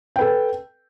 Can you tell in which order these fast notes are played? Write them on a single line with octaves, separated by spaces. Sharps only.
G5 B4 A4